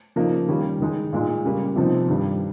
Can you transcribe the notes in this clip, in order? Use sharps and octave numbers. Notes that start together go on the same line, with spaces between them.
C#3 F3 A#3 D#4
D#3 G3 C#4
D#3 G#3 D#4
A#2 G#3 D#4
C#3 G3 A#3 C#4
C3 F3 C4 D#4
G2 D#3 G3